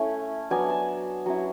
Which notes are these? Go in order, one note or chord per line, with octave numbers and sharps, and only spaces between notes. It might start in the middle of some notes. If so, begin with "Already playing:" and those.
Already playing: A3 C#4 E4
F#3 B3 D4 G#5
A5
F#3 C#4 E4